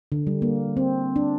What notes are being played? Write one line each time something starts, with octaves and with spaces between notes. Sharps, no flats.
D3
G3
A#3
C4
D4